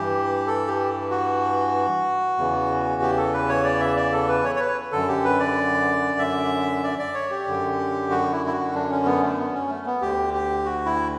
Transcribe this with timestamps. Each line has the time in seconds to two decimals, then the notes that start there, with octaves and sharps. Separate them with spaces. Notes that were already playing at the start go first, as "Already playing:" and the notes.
Already playing: G2 E3 G4
0.47 A4
0.67 G4
1.11 F#4
2.37 E2 C#3 E3
3.02 G4
3.17 A4
3.34 B4
3.49 C#5
3.64 D5
3.80 E5
3.97 D5
4.13 A4
4.29 B4
4.45 C#5
4.56 C#5
4.60 B4
4.92 F#2 D3 A4
5.08 G4
5.25 B4
5.39 D5
6.19 E5
6.84 D5
6.99 D5
7.14 C#5
7.31 G4
7.47 F#2 D3
8.10 F#4
8.32 E4
8.46 E4
8.53 F#4
8.74 D4
8.90 C#4
9.05 B3
9.22 A3
9.38 B3
9.54 C#4
9.69 A3
9.86 B3
10.01 D2 D3 G4
10.34 G4
10.65 F#4
10.86 E4